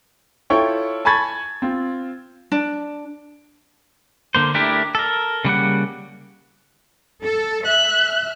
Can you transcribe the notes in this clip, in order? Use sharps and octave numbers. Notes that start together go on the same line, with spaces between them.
E4 F4 A4 C#5 G5 C#6
G#5 A5 B5 C#6 G#6 A6
C4 F4
D4
D3 A#3 C5
A3 D4 E4 G4 A#4
A4 A#4
C#3 G3 A#3 F#5
A4
E5 F#6